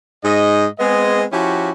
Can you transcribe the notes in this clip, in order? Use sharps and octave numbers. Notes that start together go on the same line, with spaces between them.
G#2 D#5
G#3 B3 C4 G#4 D#5
F3 C#4 E4 F#4 G4